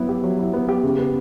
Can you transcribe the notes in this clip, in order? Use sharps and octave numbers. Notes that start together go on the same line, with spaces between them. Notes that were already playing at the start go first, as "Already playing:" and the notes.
Already playing: F#3 B3 E4
G4
F#3
E4
B3
G4
C#3
B3